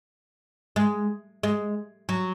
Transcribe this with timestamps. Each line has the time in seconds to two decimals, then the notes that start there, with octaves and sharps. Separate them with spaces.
0.76 G#3
1.43 G#3
2.09 F#3